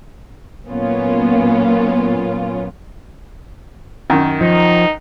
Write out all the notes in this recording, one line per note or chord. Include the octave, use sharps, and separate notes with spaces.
A#2 F#3 A#3 B3 C#4 F4
F#2 D#3
F3 D#4